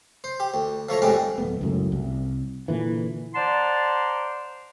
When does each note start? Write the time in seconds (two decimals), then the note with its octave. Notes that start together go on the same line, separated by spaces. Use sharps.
0.24 C5
0.40 G4
0.54 D2
0.89 F3 A3 C#5 A#5
1.02 A1 F2 A2 G3 G#3 D6
1.38 D1 A3 B3
1.61 C#2 F#2 A2
1.92 C2
2.68 A#2 D3 E3
3.35 C5 D5 F#5 A5 A#5 C6